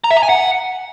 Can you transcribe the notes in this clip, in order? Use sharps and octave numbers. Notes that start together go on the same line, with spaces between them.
A#5
E5
A#5
G#5
F#5